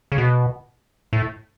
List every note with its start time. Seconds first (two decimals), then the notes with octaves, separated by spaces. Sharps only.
0.12 C#3
0.18 B2
1.13 A2